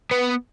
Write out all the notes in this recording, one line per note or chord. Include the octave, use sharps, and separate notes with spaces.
B3